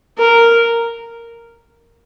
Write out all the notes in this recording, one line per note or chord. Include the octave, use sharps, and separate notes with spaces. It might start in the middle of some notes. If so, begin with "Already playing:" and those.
A#4